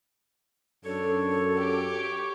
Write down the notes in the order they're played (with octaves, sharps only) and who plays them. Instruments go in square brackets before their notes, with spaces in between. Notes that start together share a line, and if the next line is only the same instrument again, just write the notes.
[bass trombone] F#2 [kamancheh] D4 [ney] A4 [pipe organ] C#5 C#6
[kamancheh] G4 D6